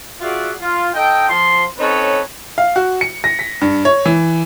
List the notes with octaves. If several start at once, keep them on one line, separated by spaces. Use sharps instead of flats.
F4 F#4 G#4 D5 E5 F#5
F4
D#4 A4 D#5 G5
F3 C6
C4 C#4 D#4 A4 B4 C#5
F5
F#4
C#7
A#6
B6
G2
C#5
E3